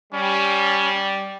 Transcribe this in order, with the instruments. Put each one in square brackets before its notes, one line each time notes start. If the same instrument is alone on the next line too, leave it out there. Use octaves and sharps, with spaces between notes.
[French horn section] G3 [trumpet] C#4